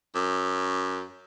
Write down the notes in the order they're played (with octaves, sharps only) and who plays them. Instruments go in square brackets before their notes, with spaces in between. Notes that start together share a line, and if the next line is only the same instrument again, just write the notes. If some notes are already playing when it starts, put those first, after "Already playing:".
[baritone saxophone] F#2